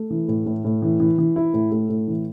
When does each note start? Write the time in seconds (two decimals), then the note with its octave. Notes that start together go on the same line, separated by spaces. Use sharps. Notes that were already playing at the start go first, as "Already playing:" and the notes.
Already playing: A3
0.10 E3
0.28 A2
0.46 A2
0.65 A2
0.82 E3
1.00 E3
1.18 E3
1.36 E4
1.54 A2
1.72 A3
1.90 A2
2.08 E3